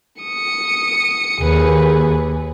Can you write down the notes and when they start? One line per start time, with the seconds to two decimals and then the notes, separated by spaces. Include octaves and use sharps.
0.22 D#6 C#7
1.41 D#2 G#4 B4